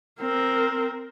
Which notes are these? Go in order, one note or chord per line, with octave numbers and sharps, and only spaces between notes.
C4 A#4